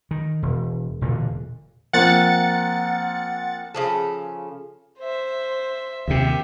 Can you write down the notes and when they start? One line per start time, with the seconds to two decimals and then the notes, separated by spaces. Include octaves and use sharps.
0.11 D#3
0.43 E1
1.01 E1 A#2 D3
1.93 F3 A#3 C4 F#5 A6 C#7
3.74 C#3 F3 A4
4.99 C5 E5
6.08 D#2 C3 G4 E5